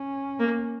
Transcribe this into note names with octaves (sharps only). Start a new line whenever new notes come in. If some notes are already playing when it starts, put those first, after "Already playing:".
Already playing: C#4
A#3